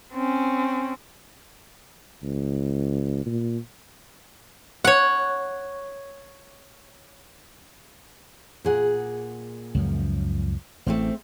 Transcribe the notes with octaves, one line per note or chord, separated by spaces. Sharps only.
C4 C#4
C#2
A#2
C#5 F#5
A#2 G#4 F#5
C#2 F#2 F3
A1 A3 C4 C5